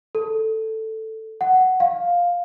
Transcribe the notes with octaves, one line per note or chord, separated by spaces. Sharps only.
A4
F#5
F5